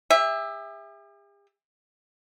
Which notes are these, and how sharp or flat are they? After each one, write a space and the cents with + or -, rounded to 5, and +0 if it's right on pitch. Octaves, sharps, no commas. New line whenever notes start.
G4 +45 E5 +0